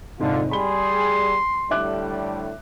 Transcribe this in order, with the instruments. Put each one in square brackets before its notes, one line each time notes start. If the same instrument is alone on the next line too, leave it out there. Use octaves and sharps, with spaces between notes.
[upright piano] F1 G#2 [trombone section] D3 F4
[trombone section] G3 G#4 [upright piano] B5 G7 [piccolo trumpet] C6
[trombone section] A2 D3 G3 [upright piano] E5 D6 F#6